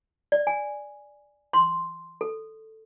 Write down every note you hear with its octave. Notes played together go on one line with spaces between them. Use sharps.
D5
G#5
C6
A4